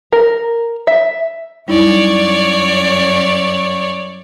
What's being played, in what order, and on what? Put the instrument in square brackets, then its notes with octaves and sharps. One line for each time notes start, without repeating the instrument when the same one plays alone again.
[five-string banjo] A#4
E5
[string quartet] F#2 C#5 D5 [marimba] G3 D#4 E4